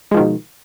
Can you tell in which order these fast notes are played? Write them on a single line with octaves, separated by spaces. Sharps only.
G#3 F3 D#3 B2